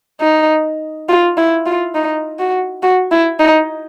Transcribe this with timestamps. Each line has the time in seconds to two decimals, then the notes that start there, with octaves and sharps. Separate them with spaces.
0.21 D#4
1.09 F4
1.37 E4
1.66 F4
1.95 D#4
2.39 F#4
2.82 F#4
3.11 E4
3.40 D#4